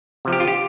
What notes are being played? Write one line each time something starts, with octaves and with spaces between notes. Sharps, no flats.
C3 F3
G4
F4
G4